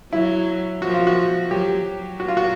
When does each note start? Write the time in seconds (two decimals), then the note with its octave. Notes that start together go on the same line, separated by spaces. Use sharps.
0.13 F#3 E4
0.82 F3 F#4
0.94 F4
1.07 F#4
1.51 F#3 G4
1.86 F#3
2.20 F#4
2.28 F4
2.37 F#4